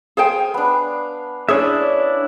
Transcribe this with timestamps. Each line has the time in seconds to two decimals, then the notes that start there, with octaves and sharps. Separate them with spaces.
0.17 G#4 C5 F5 G5 G#5 D#6
0.54 B3 D4
1.49 C#4 D4 E4 G#4 C#5 D5 E5